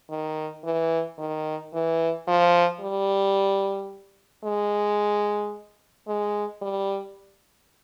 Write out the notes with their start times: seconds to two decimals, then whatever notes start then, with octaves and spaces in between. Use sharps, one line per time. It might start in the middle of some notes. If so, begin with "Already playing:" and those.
0.11 D#3
0.65 E3
1.19 D#3
1.74 E3
2.28 F3
2.81 G3
4.44 G#3
6.08 G#3
6.62 G3